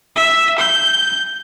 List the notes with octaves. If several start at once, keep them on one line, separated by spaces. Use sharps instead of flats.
E5
G6